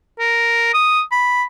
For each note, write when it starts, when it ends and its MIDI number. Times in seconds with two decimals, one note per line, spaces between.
0.19 0.69 70
0.74 1.02 87
1.12 1.43 83